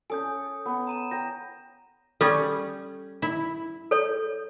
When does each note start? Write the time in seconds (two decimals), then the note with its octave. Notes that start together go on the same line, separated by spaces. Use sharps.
0.10 C#4 A4 G#5 D#6 G6
0.66 B3
0.87 A#5 D#7 E7
1.11 G5 A#5 A#6
2.21 G3 C#4 A4
3.22 E4
3.91 A4 C#5